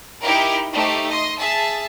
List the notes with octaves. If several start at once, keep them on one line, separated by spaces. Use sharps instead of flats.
D#4 E4 G4 A#4
A3 D#4 G4 C5
D#5 C6
G#4 E5 A5